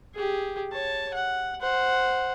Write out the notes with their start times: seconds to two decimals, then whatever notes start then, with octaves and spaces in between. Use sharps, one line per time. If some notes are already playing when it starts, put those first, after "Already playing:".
0.15 G4 G#4
0.72 C#5 A5
1.14 F#5
1.61 C5 F#5